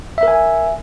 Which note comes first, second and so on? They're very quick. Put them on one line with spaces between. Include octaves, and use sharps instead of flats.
E5 A#4 G#5